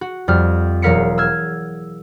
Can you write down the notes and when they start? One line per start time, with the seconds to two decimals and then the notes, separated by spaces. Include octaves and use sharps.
0.01 F#4
0.28 F2 G3 F4 F6
0.82 E1 F#3 A#4 F5 B6 C#7
1.18 E6 F6 G#6